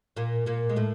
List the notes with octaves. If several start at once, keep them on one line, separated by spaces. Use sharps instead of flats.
A#2 A#3
A#2 A#3
G#3
A2 A3